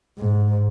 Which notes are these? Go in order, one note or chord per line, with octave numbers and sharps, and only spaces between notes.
G#2